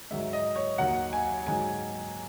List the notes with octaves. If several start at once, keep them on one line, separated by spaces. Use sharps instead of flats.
G#2 D#3 F#3 E5
D#5
C#5
D#2 D#3 F#3 F#5
G#5
G#2 D#3 F#3 G#5